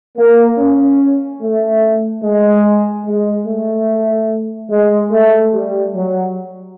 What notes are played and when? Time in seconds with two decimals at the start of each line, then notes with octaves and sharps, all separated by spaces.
0.17 A#3
0.59 C#4
1.41 A3
2.23 G#3
3.06 G#3
3.47 A3
4.70 G#3
5.11 A3
5.53 G3
5.95 F#3